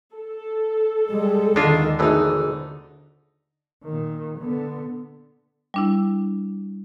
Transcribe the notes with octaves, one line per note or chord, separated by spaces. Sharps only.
A4
G3 G#3
D#2 D3 D#3 G#3 D4 F4
G#1 D3 E3 A3 B3 D#4
A#2 D#3
D3 B3
G3 D4 E4